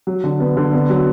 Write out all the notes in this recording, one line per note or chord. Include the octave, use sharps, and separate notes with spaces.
F#3
D3
B3
D3
B3
F#3